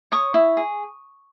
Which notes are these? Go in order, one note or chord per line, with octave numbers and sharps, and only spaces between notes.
C#5 C#6 D#6
E4
G#4